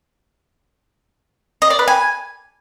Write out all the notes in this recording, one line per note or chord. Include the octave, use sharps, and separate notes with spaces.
D#5
D5
B4
G#5